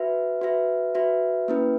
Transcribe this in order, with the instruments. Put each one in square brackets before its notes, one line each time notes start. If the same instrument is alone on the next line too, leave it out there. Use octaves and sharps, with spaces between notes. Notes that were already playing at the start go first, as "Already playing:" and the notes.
Already playing: [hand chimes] F#4 B4 E5
F#4 B4 E5
F#4 B4 E5
A#3 C#4 E4 B4